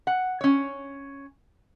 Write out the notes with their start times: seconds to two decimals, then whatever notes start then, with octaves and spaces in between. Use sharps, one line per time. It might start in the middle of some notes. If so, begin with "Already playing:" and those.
0.07 F#5
0.41 C#4 C#5